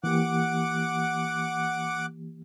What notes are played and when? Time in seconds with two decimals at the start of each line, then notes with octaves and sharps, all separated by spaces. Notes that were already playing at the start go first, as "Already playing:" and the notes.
0.04 E3 A#3 G4 F#5 D6